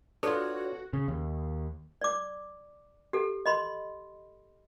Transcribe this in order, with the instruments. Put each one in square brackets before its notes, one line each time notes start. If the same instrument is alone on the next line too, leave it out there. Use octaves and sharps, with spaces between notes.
[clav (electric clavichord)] D4 F4 [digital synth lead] F#4 [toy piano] A4 B4 [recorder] C#5
[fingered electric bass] C#3
D#2
[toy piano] D5 D6
G4 A4
D#5 B5 C6